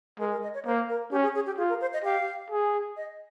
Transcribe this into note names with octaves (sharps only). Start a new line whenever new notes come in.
G#3 A#4
A#4
D#5
C#5
A#3 C5
A#4
C#4 G4
G#4
G#4
G4
F4 G#4
A#4
C5
D#5
G4 F5
G#4
D#5